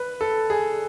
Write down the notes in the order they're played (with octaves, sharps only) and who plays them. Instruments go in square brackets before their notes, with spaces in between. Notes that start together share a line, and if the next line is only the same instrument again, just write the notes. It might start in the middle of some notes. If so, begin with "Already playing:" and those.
Already playing: [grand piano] B4
A4
G#4